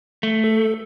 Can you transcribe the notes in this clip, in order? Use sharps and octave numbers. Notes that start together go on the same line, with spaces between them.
A3
A4